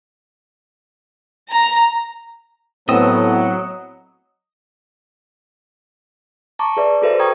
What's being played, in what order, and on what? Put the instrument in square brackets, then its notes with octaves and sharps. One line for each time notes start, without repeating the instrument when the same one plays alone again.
[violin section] A#5
[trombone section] A2 B3 [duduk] F#3 [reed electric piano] C4 [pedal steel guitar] D#5 D#6 E6
[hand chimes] A5 A#5 C#6 D6
G#4 B4 D5 E5
F#4 G#4 A4 B4 C5 E5
G5 A#5 C#6 D#6 G#6